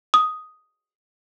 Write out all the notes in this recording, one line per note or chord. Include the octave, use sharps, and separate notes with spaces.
D#6